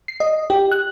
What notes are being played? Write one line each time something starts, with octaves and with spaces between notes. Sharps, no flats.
C7
D#5
G4
F#6